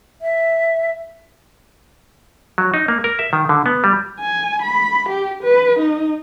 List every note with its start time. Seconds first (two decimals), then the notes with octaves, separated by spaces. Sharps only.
0.22 E5
2.58 F#3
2.74 D#4
2.88 A#3
3.04 A#4
3.19 E5
3.33 D#3
3.49 D3
3.66 B3
3.84 G3
4.21 G#5
4.62 B5
5.09 G4
5.44 B4
5.79 D#4